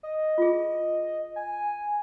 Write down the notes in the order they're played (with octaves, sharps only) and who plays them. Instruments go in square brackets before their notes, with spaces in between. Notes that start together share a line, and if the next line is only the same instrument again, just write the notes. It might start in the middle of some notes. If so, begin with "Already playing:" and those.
[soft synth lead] D#5
[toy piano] F4 G#4
[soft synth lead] G#5